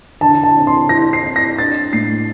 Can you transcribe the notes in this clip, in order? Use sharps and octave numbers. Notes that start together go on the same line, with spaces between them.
D3 A5
A5
C4
C6
E4 A#6
C7
C4
A#6
D4 A6
A2 C7